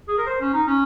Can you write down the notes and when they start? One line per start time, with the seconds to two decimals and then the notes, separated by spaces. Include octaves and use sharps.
0.08 G#4
0.18 A#4
0.27 C5
0.41 C#4
0.54 D#4
0.67 C#4